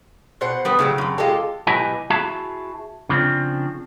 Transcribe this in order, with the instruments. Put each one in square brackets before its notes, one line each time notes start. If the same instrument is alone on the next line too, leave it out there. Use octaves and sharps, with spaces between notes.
[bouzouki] B2 C5 F#5
[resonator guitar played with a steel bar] G3 B3 B4
[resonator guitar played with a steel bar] A2 F#3 G3 [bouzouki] C#3
[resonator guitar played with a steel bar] F#2 C3
[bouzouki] G#3 G4 [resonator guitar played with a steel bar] F4 A4
[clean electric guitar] B1 E4 G4 B4 D#5 G#5
E4 F#4 G#4 E5 A5
C#3 F3 C4 D4